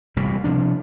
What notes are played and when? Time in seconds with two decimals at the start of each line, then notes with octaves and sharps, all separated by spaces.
0.16 E1 C2 A#2 G3
0.44 C3 F3 D4